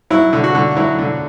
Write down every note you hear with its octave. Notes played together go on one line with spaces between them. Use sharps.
F#3 E4
D3
F#4
D3
F#3 E4
D3